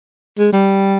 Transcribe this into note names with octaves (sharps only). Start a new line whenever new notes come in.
G#3
G3